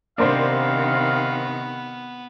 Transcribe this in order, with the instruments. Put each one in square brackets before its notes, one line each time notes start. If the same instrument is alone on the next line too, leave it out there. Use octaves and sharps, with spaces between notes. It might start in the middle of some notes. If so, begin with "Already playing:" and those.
[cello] C3 D#3 [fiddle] B3 [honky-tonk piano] D4 A#4 C5 [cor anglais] F5